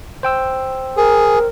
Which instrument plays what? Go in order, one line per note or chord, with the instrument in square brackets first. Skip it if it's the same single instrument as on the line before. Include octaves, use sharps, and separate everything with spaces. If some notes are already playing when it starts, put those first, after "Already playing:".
[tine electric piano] C5 G5 E6
[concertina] G#4 [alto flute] A#4